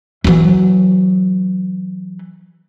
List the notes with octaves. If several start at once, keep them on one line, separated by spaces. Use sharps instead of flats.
E3 F#3